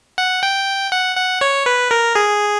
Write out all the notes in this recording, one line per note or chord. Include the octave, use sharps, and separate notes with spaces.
F#5
G5
F#5
F#5
C#5
B4
A#4
G#4